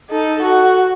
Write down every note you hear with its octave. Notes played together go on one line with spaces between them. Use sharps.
D#4 A4
F#4